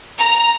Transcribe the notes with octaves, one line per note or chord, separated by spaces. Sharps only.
A#5